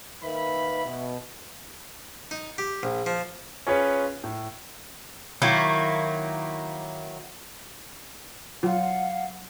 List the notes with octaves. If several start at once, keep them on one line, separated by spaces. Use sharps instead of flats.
D#3 A#3 B4 E5 B5
B2
D#4
G4
A#1
F3
C#4 F4 G#4 B4 C#5
A2
D#3 F#3 A#3 E4
F#3 F4 F5 F#5